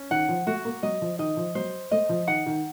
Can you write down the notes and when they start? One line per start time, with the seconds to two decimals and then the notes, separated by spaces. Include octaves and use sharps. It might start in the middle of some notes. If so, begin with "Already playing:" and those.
Already playing: C#4
0.11 D#3 F#5
0.29 F3
0.47 A3 F#4
0.65 A#3
0.83 F#3 D#5
1.02 F3
1.19 D#3 D#5
1.37 F3
1.55 F#3 C5
1.91 A3 D#5
2.09 F3
2.27 D#3 F#5
2.46 D#3